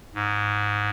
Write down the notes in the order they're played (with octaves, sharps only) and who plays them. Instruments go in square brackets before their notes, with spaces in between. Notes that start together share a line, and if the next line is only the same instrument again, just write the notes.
[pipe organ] G#2